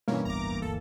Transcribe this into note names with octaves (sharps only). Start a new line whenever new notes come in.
G2 B2 E3 A#3 C#4
D1 G1 B3 A#5 D6
G1 D2 A4